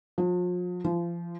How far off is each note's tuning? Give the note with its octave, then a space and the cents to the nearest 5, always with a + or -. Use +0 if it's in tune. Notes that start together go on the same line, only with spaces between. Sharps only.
F3 +40
F3 -30